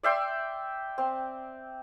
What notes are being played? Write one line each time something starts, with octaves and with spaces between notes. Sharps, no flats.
D5 E5 G5 C6
C4